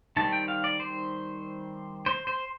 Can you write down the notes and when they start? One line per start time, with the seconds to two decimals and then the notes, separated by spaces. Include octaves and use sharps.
0.17 D#3 G3 C4 A5
0.32 G5
0.48 F5
0.64 D5
0.80 C5
2.06 C5
2.27 C5